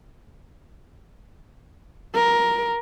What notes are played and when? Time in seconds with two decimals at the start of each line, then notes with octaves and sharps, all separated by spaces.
2.14 A#4